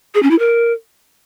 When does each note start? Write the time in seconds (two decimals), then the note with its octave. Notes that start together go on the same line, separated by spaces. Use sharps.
0.15 G#4
0.23 C#4
0.31 E4
0.39 A#4